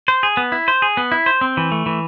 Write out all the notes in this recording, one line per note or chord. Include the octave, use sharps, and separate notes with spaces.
C5
G#4
B3
E4
C5
G#4
B3
E4
C5
C4
E3
A3
E3